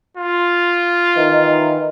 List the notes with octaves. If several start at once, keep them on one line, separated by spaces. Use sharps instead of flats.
F4
D#3 E3 D#4